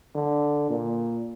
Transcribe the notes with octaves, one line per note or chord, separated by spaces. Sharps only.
D3
A#2